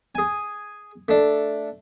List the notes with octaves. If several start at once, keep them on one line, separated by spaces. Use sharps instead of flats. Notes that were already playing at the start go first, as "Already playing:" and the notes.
G#4 G#5
A3 D4